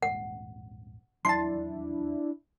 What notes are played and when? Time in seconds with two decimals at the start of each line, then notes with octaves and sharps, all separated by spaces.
0.02 D#1 A#1 G#2 F#5
1.25 D#1 E2 F#3 D4 E4 A5 C6